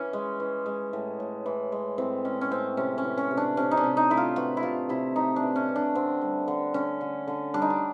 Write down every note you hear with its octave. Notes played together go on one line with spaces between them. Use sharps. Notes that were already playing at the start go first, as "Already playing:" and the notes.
Already playing: E3 C#4
G#3
E3
G#3
A2
A2
E3
G#3
A2 C4
G#3 C#4
C#4
A2 C4
C3 C#4
C#4
E3
C#4
C3
D4
C3 C#4
D#4
D4
C3
D#4
A3 E4
F4
E3 F#4
E4
C3 F4
C3 E4
A3 D#4
D4
E3
C#4
E3
D4
D3 C4
G3
D3
D3 C#4
D3
D3
G3 D4
D#4
D4